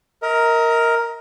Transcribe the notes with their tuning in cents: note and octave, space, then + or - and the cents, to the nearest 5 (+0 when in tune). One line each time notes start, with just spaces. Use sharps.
A#4 +0 D#5 +40